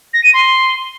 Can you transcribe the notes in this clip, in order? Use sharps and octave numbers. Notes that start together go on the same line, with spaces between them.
A#6
D#7
C6